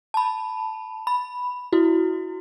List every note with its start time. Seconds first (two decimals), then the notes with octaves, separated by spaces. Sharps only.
0.14 A5 B5
1.07 B5
1.72 E4 F#4